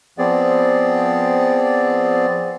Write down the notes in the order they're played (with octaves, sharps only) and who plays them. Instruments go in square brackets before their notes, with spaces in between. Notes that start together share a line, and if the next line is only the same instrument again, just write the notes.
[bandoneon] F3 B3 C4 G#4 D5